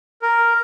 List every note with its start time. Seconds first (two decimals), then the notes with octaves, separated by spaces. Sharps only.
0.22 A#4